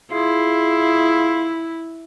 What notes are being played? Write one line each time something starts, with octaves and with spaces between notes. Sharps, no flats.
E4 F4 G#4 C6